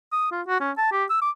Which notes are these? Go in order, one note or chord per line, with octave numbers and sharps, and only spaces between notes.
D#6
F4
F#4
C#4
A5
G4
E6
D6